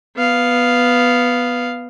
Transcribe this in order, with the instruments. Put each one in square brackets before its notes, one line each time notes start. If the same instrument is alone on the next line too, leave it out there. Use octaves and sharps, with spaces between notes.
[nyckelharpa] B3 F5